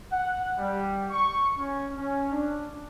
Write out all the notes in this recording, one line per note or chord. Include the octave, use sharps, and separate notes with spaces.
F#5
G3
C#6
C#4
C#4
D4